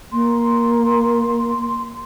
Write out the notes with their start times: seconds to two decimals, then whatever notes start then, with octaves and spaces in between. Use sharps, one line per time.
0.12 A#3 C6